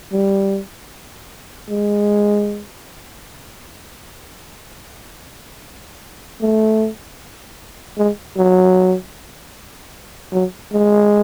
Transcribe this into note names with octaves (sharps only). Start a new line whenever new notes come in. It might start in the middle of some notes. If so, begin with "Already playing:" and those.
G3
G#3
A3
G#3
F#3
F#3
G#3